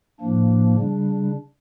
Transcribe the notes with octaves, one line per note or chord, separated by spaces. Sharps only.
A2 F3 A#3 D4
C#3 G3 D4